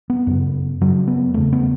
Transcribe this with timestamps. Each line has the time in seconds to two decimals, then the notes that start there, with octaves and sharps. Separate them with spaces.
0.10 B3
0.27 F#2 C#3
0.81 F#2 C#3 F#3
1.07 B3
1.34 E2 C#3 A3
1.53 B3